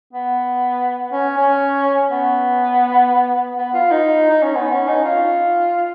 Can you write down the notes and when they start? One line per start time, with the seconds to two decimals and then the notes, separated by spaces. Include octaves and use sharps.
0.13 B3
1.12 C#4
1.37 C#4
2.11 B3
3.58 B3
3.74 F4
3.91 D#4
4.30 D#4
4.42 C#4
4.55 B3
4.72 C#4
4.88 D#4
5.04 F4